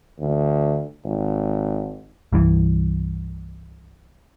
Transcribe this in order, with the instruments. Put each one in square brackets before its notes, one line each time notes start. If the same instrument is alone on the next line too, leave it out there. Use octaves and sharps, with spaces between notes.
[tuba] D2
G#1
[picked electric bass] C2 G2 E3